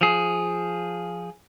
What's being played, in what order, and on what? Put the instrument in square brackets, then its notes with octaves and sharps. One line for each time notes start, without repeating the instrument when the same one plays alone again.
[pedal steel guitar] F3 G#4